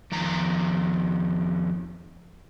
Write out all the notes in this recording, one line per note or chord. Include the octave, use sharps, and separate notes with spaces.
F2 D#3 A#5